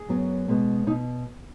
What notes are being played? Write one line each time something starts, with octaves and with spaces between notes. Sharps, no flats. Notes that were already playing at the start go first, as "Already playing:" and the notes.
Already playing: G#4
F#2 F#3 B3
B2 G#3 B3
B2 D#4